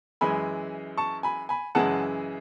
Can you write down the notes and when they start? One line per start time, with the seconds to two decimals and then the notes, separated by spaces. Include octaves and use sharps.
0.21 F#2 E3 G#3 G#5 B5
0.98 A5 C#6
1.23 G#5 B5
1.49 G#5 B5
1.75 F#2 C#3 E3 G#3 F#5 A5